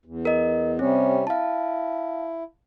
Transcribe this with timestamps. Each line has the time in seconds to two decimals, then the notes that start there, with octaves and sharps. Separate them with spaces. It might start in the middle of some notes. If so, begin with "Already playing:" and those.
0.05 E2
0.25 A#4 D#5
0.79 C3 G3 C4 C#4
1.27 E4 F5 A5